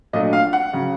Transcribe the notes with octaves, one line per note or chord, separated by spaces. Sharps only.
A#2 F#3 A3 D4 D#5
F5
F#5
C#3 F#3